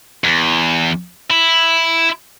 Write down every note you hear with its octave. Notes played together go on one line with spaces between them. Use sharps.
E2
E4